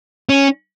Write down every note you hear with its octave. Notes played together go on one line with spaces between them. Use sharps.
C#4